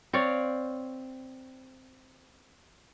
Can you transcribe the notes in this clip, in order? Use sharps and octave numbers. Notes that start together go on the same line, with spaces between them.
C4 C#5 D5 F5